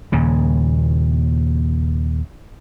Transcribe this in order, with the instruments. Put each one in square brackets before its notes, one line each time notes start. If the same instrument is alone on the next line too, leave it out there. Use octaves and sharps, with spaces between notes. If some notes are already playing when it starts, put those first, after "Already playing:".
[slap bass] D#2 A#2 C#3